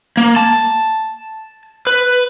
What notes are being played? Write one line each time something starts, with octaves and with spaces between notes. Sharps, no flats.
A#3
A5
B4